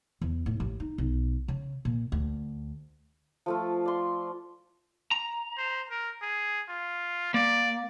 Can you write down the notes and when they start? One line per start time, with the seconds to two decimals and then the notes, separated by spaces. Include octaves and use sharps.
0.22 E2
0.46 A2
0.60 A1
0.80 D#4
0.98 B1
1.48 C#3
1.85 A#2
2.12 D2
3.46 F3 A3 F4
3.85 D5 C6
5.11 A#5
5.57 C5
5.90 A#4
6.22 G#4
6.69 F4
7.34 A#3 D5